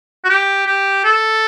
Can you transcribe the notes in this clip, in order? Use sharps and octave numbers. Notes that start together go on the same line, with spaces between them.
F#4
G4
G4
A4